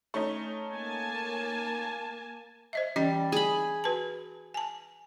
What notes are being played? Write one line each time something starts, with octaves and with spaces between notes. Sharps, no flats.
A3 C#4 D#4
A#3 G#5 A5
C5 D#5 E5
E3 G3 C#4 D#5
G#4 B5
F#4 B4 A5
G#5 A5